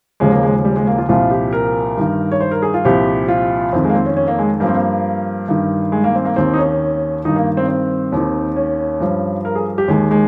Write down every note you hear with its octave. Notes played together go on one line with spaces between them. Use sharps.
D#2 C#3 F3 G#3
A#3
G#3
G3
G#3
A#3
F4
C2 A#2 F3 F4
G4
A#4
G2 D#3
C#5
C5
A#4
G#4
F4
C2 A#2 F3 G4
F4
F2 D#3 C4
G#3
A#3
C4
C#4
C#4
A#3
G#3
G2 F3 A#3 C4
A#3
G2 D#3
G#3
A#3
C4
A#3
D#2 D#3 C4
D#4
C#4
G2 D#3 D#4
A#3
C4
C4
D#2 D#3
C#4
G2 F3
A#4
G#4
G4
D#2 D#3 G#3
G#3